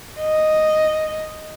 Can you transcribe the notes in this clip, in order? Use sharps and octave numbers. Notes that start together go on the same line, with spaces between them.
D#5